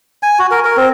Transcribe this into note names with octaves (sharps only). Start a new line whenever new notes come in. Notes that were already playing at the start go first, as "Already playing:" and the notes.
G#5
F#4
A#4
A#4
C4